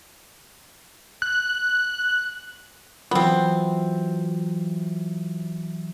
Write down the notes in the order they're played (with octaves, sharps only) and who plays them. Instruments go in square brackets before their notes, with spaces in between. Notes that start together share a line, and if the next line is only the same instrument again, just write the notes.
[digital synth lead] F#6
[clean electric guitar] E3 F#3 F4 [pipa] B3 C4